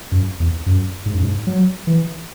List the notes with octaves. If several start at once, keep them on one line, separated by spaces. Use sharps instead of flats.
F#2
E2
F#2
G#2
F#2
G#2
F#3
E3